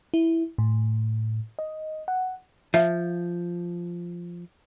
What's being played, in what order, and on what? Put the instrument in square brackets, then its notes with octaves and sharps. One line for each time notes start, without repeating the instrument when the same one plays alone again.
[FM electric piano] E4
A2
D#5
F#5
[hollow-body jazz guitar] F3 [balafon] E5